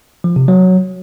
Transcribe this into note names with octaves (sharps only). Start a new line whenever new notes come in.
F3
C3
F#3